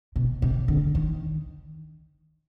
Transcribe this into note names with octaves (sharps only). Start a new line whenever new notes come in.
B2
C3
D3
D#3